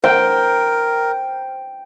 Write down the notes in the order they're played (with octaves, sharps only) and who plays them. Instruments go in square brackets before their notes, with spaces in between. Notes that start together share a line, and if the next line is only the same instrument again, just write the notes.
[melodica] A#4 [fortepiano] C5 [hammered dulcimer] G5